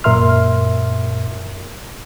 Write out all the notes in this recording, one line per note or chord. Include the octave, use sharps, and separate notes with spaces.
F#2 A#2 A#4 E5 C6 F6